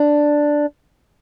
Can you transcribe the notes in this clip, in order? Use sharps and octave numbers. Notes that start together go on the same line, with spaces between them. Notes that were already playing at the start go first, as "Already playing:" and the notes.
Already playing: D4